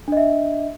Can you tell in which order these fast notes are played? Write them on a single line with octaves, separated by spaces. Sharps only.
D4 D#5 E5